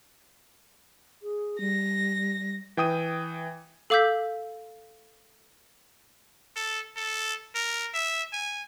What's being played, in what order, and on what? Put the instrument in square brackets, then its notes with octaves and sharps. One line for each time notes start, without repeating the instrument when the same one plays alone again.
[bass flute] G#4
[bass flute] G3 [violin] A#6
[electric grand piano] E3 G5 D#6 D#7
[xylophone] A4 F5 D6 E6 G6 B6
[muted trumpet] A4
A4
A#4
E5
G#5